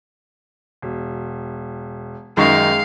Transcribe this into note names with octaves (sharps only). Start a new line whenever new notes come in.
E1
F#2 D#3 G#3 F5 C#6